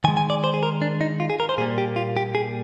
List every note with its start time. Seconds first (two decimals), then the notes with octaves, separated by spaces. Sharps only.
0.04 D#3 G#5
0.08 G#3
0.17 G#5
0.30 D5
0.44 C5
0.54 G#4
0.63 A#4
0.82 D4
1.01 D#4
1.20 F4
1.30 G#4
1.40 A#4
1.49 C5
1.58 A#2 G#4
1.61 G3 A#3
1.78 G4
1.96 F4
2.17 G4
2.35 G#4